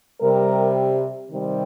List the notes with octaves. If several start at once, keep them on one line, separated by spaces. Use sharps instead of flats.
C3 G3 A#4
C3 D#3 G3